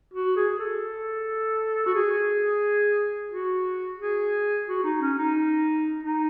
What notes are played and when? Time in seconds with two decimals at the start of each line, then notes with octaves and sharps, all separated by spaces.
0.13 F#4
0.36 G#4
0.59 A4
1.86 F#4
1.95 G#4
3.31 F#4
3.99 G#4
4.68 F#4
4.84 D#4
5.01 C#4
5.18 D#4
6.03 D#4